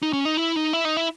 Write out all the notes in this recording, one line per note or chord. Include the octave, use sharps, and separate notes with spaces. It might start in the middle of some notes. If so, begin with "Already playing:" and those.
D#4
C#4
D#4
E4
D#4
E4
D#4
E4